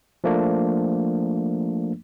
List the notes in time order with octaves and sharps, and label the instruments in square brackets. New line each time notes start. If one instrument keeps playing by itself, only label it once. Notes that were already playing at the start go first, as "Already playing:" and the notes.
[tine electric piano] F3 A3 A#3 D4